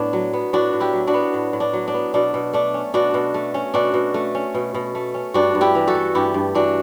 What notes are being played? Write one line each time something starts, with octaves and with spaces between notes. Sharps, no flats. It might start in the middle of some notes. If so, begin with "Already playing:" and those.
Already playing: A2 B3 D4
F#3
B3
A2 D4 F#4
A2
E4 G4
F#3
D4 F#4
B3
A2
A2
D4
F#3
D4
B3
B2 D4
B2
A3 D4
C#4
B2 D4 F#4
B2
A3
C#4
B2 D4 F#4
B2
A3
C#4
B2
B2
A3
C#4
G2 D4 F#4
G2
E4 G4
E3
F#4 A4
A3
G2 E4 G4
G2
E3 D4 F#4